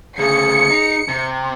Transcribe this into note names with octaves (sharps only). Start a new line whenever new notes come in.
D2 C#3 G#4 C#7
D#4
C3